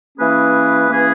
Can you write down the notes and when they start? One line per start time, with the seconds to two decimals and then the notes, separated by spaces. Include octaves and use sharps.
0.18 E3 A#3 C#4 G#4 B4
0.88 E3 A#3 C#4 G#4 B4